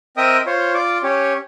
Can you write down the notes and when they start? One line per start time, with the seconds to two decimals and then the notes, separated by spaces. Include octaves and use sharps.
0.17 C4 A#4 D#5 E5 G5 D#6
0.46 F4 C5 C#5
0.75 F4 D5 D6
1.03 C#4 G4 C#5